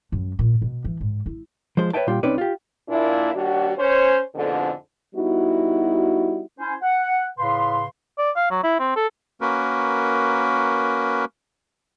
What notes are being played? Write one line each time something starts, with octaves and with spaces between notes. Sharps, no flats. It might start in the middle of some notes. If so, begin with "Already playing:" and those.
F#2
A#2
B2
E3
G#2
E4
F3 G#3 C5
B4 C#5 D#5 E5 G5 A5
A#2 G3 F4 G5
C2 C4 C#4 D#4 B4 D5
F4 G4
A#2 A#3 D4 E4
D#2 G3 D4 F#4
C#4 C5
F2 G#2 B2 D3
G3 B3 D#4 E4 F#4
C#4 E4 C5 G#5
F#5
A2 C#3 B4 F5 C6
D5
F5
F#3
E4
C4
A4
A#3 C#4 F#4 A#4 B4